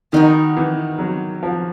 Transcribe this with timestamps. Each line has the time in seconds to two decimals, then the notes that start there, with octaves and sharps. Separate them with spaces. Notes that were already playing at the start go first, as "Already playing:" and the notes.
0.12 D#3 B3 D#4 F#4 A#4
0.57 E3
0.99 F#3
1.43 F3